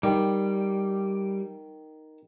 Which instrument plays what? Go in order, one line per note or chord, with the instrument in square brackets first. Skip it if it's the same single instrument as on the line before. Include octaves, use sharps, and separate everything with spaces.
[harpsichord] D#3 [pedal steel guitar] G3